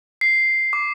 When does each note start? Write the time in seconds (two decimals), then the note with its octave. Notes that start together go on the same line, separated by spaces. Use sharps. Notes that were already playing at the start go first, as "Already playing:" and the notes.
0.21 C7
0.73 D6